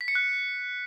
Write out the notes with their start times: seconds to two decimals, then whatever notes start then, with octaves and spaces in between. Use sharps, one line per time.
0.01 B6
0.08 C#7
0.15 F#6